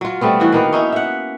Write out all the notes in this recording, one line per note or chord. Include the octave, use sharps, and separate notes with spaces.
F#3 F4
G3 A3 B3 C4
E3 F#4
D#3 A#3 B3
C#4 D#4 E4
E5 F#5